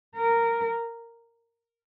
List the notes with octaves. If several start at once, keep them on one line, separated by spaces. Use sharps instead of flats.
A#4